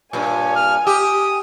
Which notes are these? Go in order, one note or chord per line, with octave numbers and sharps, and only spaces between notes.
G2 A#2 C#5 G#5
F6
G4 D#6